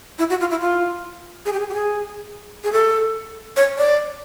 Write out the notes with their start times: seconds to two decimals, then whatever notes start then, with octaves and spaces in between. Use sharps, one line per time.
0.19 E4
0.30 F#4
0.41 F4
0.50 E4
0.61 F4
1.46 G#4
1.53 G4
1.60 G#4
1.69 G4
1.74 G#4
2.64 G#4
2.72 A4
3.57 C#5
3.78 D5